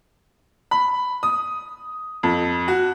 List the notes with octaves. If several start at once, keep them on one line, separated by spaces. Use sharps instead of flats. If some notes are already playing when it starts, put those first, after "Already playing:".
B5
D#6
F2
F#4